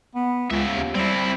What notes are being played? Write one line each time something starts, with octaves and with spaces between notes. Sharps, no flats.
B3
C#2 C#3 E5
D#2
G3 C4 E4